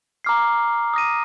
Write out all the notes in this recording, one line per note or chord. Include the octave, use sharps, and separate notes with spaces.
A#5 D6 F6 C7
D#6 A#6 D#7